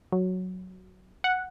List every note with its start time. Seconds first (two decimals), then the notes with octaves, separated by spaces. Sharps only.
0.12 F#3
1.24 F#5